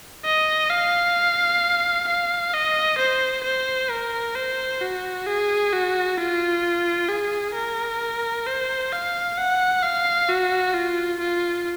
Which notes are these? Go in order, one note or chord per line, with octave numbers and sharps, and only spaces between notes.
D#5
F5
F5
D#5
C5
C5
A#4
C5
F#4
G#4
F#4
F4
G#4
A#4
C5
F5
F#5
F5
F#4
F4
F4